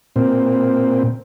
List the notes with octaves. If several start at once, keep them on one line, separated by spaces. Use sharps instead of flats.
A#2 C4